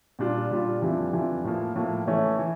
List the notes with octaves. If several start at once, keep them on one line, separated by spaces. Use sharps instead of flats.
A#2 G3 D4 F4
A#2 G3 D4 F4
F2 E3 G3 D4 F4
F2 E3 G3 D4 F4
A2 F3 A#3
A2 F3 A#3
E3 A3 C#4 E4
E3